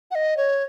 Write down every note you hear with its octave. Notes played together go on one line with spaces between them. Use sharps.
F#5
D#5
C#5